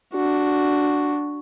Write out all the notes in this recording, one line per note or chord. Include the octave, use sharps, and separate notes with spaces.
D4 F#4